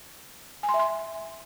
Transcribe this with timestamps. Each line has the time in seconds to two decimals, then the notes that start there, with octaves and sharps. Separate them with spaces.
0.63 G#5
0.69 C6
0.74 E5
0.79 C6